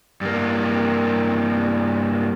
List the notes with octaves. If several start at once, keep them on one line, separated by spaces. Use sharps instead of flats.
G2 A#3